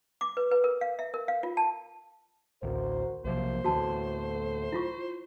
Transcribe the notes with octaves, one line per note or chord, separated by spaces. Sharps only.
D6
B4
B4
A#4
F5
E5
A#4
F5
F4
A5
A1 D2 F#4 A#4 C5
B1 C3 F3 A#3 C5
D2 A2 E3 A3 F#4 A5
E4 F4 C#6